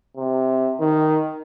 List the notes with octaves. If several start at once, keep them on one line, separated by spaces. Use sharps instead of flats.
C3
D#3